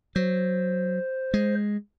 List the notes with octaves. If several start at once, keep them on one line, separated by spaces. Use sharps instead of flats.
F#3 C5
G#3